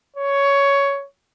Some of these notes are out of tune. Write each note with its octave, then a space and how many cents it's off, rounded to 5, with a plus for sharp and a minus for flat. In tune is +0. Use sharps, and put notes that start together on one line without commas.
C#5 +10